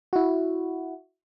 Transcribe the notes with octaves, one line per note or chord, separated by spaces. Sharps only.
E4 F#4